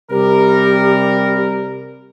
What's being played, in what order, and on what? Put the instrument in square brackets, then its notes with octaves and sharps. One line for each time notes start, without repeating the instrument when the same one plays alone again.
[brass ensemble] C3 G3 A#4 [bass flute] G4